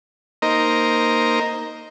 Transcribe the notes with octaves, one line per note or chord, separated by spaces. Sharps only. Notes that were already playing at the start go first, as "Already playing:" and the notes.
A#3 D#4 A#4 C5 D#5 A#5